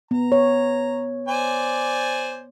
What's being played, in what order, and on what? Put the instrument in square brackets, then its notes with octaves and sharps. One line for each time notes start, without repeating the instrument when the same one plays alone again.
[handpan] B3 [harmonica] A#5
[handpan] C#5
[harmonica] C5 D5 G#5